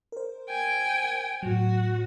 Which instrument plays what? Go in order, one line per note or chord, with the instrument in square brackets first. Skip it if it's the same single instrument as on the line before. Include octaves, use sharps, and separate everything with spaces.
[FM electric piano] A#4 C5
[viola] G5 G#5
[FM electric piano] A2 F#3 [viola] F#4